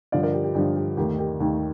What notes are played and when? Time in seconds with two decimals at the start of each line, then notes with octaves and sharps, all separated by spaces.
0.12 G2 D3 F3 D5 F5
0.23 A#4 D5
0.34 G4
0.44 G4
0.55 G2 D3 F3 G4
0.76 G4
0.97 D#2 D#3 A3 G4
1.18 G4 A#4
1.40 D#2 D#3 A3